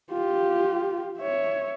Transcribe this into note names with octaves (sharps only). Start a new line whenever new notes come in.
F4 G4
C#5 E5